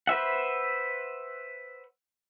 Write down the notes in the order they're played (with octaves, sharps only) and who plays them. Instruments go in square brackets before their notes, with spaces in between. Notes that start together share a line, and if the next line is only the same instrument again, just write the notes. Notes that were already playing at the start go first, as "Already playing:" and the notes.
[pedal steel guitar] B4 C5 E5 F#5